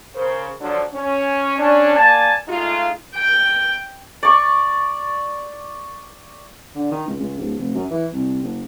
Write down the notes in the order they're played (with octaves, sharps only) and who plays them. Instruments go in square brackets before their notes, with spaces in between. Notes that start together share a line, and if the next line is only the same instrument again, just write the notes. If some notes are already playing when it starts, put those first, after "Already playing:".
[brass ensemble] C#3 A#4 C5
D3 F3 F#3 D4
C#4
C#4 D4
A#3 D5 G#5 A5
G#3 A3 D#4 F4
[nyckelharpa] G5
[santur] D5 C#6
[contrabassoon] D3
D#3
C#2
C#2
D1
F1
F#2
E3
C2
F#1